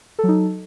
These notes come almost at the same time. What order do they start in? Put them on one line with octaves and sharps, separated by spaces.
A4 F#3 D#4